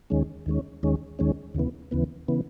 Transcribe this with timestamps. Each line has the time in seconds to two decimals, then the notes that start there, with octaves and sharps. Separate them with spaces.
0.10 D#2 D#3 G#3 C#4
0.46 D#2 D#3 G#3 C#4
0.83 D#2 D#3 G#3 C#4
1.19 D#2 D#3 G#3 C#4
1.55 D#2 C#3 E3 B3
1.91 D#2 C#3 E3 B3
2.28 C#3 E3 B3